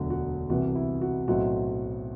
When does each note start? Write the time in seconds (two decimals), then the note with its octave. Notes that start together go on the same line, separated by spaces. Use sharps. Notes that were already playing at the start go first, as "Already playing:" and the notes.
Already playing: E1 D2 D3 F#3 F#4
0.10 F#4
0.49 C2 C3 E3 F#4
0.75 E4
1.01 F#4
1.28 B1 A2 F#3 C4 F#4